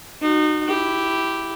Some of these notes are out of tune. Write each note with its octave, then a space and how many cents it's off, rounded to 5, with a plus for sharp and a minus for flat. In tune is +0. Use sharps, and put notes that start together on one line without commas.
D#4 -30 F#4 +0
E4 +0 G4 -5